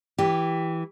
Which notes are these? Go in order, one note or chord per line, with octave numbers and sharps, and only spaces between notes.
E3 G4